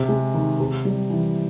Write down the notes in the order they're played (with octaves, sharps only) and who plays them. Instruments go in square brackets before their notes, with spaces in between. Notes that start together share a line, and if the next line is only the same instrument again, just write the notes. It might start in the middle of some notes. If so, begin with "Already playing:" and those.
Already playing: [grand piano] C3
G#3
D#3
C3
G3
E3